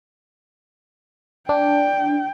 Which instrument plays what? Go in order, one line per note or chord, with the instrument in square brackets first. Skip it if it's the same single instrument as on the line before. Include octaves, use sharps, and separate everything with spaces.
[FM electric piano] D4 [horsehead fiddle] G5